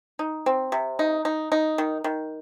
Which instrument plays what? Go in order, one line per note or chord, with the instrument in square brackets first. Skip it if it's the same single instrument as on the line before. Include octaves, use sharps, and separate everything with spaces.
[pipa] D#4
C4
C3
D#4
D#4
D#4
D#3
D#3